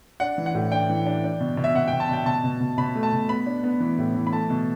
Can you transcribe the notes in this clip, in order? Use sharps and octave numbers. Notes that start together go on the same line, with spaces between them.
D4 F#5
E3
F#5
A2
D4 G5
E3
D4
D4
B2
B2
E5
B2 F#5
G5
B2
A5
B2 G5
B2 A5
B2
B2
B2 B5
A3
A5
B2
B3 B5
D4
B3
E3
A2
E3
B5
A3 A5
B2